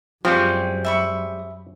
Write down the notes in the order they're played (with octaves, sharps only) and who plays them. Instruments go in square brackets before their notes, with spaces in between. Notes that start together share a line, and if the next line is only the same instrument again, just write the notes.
[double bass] F#2 [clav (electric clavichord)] F3 [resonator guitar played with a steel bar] G3 G#3 C4 [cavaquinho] C#6
[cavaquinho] E5 B5 C#6